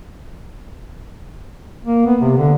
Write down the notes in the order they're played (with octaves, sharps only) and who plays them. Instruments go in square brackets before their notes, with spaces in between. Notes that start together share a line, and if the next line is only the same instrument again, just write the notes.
[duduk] A#3
B3
C3
D3